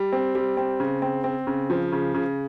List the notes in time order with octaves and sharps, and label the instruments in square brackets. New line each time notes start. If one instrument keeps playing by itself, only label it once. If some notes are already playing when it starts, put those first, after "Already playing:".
Already playing: [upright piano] G3
C4
G3
C4
C#3
C4
C4
C#3
F3
C#3
C#3